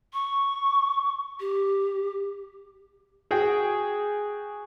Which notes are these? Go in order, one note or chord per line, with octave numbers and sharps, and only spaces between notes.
C#6
G4
F#4 G#4 G5